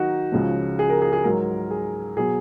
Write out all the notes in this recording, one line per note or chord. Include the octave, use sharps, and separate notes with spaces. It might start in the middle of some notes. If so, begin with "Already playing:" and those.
Already playing: D#3 F#3 D#4 F#4
C#2 C#3 F3
G#4
A#4
G#4
G#4
G#2 F#3 A#4
G#4
B2 F#3 G#4